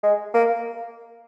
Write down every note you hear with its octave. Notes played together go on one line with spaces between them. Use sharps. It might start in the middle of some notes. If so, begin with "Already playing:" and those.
G#3
A#3